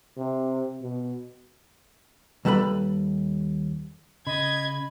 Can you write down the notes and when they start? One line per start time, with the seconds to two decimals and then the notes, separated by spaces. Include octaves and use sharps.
0.17 C3
0.82 B2
2.45 D#2 G3 A4 B4 B5
4.27 C#3 D#5 B5 G#6